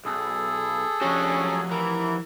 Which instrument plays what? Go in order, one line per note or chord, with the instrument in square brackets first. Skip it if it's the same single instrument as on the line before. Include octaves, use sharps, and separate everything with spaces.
[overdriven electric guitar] B1 [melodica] G#4 A4
[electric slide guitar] F3 G4 [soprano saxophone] C#4 [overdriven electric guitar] D4 F#4
[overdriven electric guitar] F#3
[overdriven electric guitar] E3 [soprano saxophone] A#4